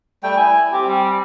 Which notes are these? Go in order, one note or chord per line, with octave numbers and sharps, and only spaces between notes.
G3 A3 G5
E4 G#5
C4 G4
G3